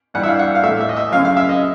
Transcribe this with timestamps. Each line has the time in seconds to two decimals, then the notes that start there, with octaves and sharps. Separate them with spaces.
0.14 G2 E3 G3 F#5
0.23 E5
0.28 F5
0.39 F#5
0.55 F5
0.63 A3 E5
0.66 A2 E3
0.80 E5
0.89 D#5
0.97 E5
1.12 F#2 C#3 F#3 F5
1.25 F5
1.37 E5
1.49 D#5